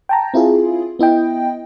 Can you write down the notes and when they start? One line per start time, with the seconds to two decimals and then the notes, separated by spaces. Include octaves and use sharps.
0.09 G5 A5 A#5
0.34 C4 E4 F4 G#4
0.99 B3 E4 D#5 G5